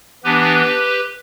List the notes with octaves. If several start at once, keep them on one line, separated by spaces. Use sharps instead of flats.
E3 B3 D4 G4 B4